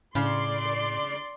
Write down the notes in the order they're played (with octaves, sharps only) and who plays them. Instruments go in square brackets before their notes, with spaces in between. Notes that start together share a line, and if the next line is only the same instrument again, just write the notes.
[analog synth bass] A2 [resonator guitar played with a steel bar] C#3 [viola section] D5 C6